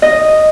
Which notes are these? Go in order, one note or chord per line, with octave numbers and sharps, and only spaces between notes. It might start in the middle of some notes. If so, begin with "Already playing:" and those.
D#5